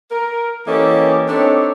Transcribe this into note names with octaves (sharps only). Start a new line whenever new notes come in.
A#4
E3 A#3 C#4 G4 A4 D#5
C4 D4 D#4 G4 A4 C#5